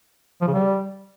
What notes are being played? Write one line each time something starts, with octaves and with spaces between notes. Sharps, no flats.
F3
C#3
G3